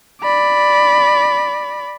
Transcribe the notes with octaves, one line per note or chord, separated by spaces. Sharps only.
D5 B5